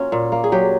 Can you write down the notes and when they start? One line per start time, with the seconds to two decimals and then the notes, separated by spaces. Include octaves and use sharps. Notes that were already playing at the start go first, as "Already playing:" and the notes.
Already playing: F#3 A#3 C#4 F4
0.12 A#2
0.32 A#3
0.44 G#4
0.52 F#3 G4